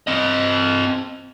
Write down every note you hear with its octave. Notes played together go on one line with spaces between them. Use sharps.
C4 D#5